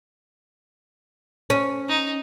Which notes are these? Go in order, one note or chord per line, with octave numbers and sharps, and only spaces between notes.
C#4
D#4